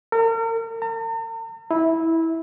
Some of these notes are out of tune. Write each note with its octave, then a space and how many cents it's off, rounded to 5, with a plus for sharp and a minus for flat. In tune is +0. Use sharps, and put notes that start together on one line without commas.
A#4 -40
A#5 -45
E4 -15